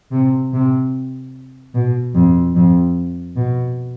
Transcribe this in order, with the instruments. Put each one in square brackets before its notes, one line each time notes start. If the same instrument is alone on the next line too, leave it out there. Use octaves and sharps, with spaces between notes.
[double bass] C3
C3
B2
F2
F2
B2